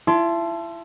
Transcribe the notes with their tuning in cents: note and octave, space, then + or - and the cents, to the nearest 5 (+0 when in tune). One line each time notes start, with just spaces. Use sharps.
E4 +35 A5 -10 C6 +0